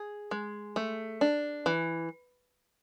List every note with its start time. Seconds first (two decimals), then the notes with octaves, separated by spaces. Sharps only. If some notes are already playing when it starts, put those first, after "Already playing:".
Already playing: G#4
0.31 G#3
0.76 A3
1.21 D4
1.66 E3